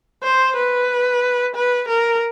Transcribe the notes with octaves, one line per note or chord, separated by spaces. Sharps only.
C5
B4
B4
A#4